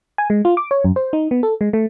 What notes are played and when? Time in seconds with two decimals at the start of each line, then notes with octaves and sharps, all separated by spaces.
0.18 G#5
0.30 G#3
0.45 F4
0.57 D6
0.71 C#5
0.84 F#2
0.96 C5
1.13 D#4
1.31 B3
1.43 A4
1.61 G#3
1.73 A3